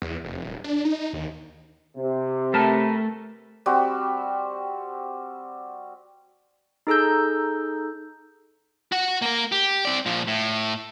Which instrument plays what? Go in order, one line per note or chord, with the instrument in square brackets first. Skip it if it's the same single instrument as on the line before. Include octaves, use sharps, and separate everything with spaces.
[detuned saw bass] E2
F1
D#1
D4
D#4
D#2
[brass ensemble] C3
[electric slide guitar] A3 [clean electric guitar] A#4 B4 A5
[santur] G3 C4 F#4
[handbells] D#4 G#4 A4 A#5 E6 G6
[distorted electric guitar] F#4 F#5
A#3 A#4
G4
C4 D5
A#2 F3
A2